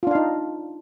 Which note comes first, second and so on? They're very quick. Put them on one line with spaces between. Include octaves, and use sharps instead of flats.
F4 D4 F5 D#4